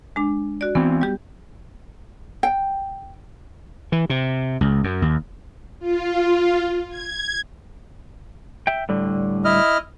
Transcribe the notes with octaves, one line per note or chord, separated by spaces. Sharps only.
G#3 D4
F#4 D5
E3 B3 C4
G3 G4
G5
E3
C3
C#2
F#2
D#2
F4
G#6
E5 G5
A2 D3 G3
E4 D#5 F6